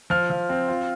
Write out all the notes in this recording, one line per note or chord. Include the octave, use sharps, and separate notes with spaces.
F3 F6
F3
C4
F4